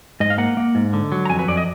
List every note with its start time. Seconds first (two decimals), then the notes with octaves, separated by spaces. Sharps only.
0.20 G#2 D#5
0.30 F5
0.38 A#3 F#5
0.57 A#3
0.75 G#2
0.93 D3
1.12 F#3
1.25 A#5
1.30 F2 G#5
1.39 B4
1.48 F2 D5
1.57 D#5